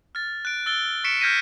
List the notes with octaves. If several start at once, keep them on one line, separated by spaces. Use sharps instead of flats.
F6 A6
F#6 D7
E6 A6 G7
C#6 B6 C#7 D7 E7
F6 G6 G#6 A#6 B6 D#7